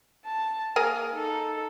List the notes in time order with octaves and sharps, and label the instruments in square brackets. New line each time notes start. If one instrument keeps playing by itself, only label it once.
[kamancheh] A5
[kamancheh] A#3 [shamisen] G#4 A#4 G#5
[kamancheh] D#4 A4